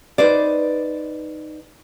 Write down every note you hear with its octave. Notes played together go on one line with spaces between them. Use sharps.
D#4 B4 C5 D5